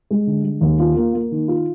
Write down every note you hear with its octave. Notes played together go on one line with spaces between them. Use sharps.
G#3
D3
G#3
D#2
F4
A#3
A#3
D#3
F4